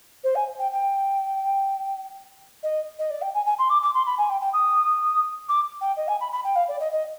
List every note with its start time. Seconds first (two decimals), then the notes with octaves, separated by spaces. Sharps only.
0.24 C5
0.35 G#5
0.59 G5
0.72 G5
2.63 D#5
2.99 D#5
3.10 D5
3.22 G5
3.34 G#5
3.46 G#5
3.58 C6
3.69 D6
3.82 D6
3.94 C6
4.06 B5
4.18 G#5
4.29 G5
4.41 G5
4.53 D#6
5.48 D6
5.81 G5
5.97 D#5
6.08 G#5
6.20 B5
6.32 B5
6.44 G5
6.56 F5
6.68 D5
6.80 D#5
6.92 D#5